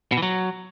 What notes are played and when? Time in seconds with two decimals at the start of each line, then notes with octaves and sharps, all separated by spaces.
0.12 B2
0.17 E3
0.22 F#3